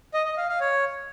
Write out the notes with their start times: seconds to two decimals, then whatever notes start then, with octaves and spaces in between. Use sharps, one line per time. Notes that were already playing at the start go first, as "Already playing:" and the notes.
0.14 D#5
0.25 D#5
0.37 F5
0.49 F5
0.60 C#5